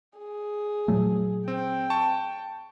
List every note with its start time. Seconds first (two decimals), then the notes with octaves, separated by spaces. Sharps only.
0.18 G#4
0.88 A#2 F#3 A3
1.48 C4 G5
1.90 A5 C#6